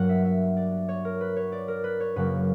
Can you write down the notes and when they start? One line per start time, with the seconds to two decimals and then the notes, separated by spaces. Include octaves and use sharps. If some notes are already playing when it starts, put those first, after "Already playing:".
Already playing: G2 F#3 A#3 A#4 F#5
0.09 E5
0.25 E5
0.57 D5
0.89 C#5
1.05 A#4
1.21 B4
1.36 C#5
1.52 D5
1.68 A#4
1.84 B4
2.00 C#5
2.16 F#2 C#3 F#3 A#3 B4